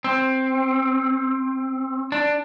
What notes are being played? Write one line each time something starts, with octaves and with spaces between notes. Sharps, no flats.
C4
D4